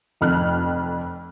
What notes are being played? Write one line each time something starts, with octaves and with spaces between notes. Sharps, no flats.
F1 F2 F6 F#6